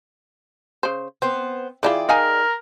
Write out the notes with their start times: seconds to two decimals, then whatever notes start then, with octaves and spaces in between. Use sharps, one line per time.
0.83 C#3 C5
1.22 B3 C4 C5
1.83 E3 E4 F4 G#4 D5 G5
2.09 D#4 A#4 F5 G#5